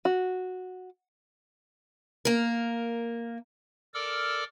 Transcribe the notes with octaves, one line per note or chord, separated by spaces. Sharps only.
F#4
A#3 A#4
A4 A#4 D5 D6 E6 F6